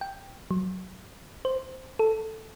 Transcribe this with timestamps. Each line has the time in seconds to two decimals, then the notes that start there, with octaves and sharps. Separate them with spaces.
0.01 G5
0.51 F#3
1.45 C5
1.99 A4